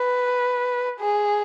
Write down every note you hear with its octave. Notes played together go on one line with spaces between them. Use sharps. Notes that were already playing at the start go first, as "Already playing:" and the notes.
Already playing: B4
G#4